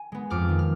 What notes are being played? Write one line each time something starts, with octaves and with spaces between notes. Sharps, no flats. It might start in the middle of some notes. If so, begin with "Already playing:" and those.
Already playing: G#5
G#3 B3
F2 D6 F6
D#3 G#3
F6